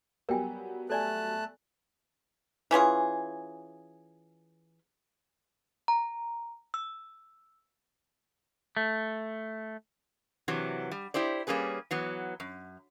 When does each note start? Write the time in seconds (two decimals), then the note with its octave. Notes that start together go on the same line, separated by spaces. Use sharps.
0.29 F#3 G3 B3 A#4 G5 G#5
0.90 A3 A4 D5 G#5 A5 F#6
2.71 E3 C#4 F4 G#4
5.88 A#5
6.74 E6
8.77 A3
10.48 C3 E3 F#3
10.92 G3
11.14 E4 G4 C5 D5
11.47 G3 A#3 C#4 G#4 B4
11.91 E3 F#3 B3
12.40 F#2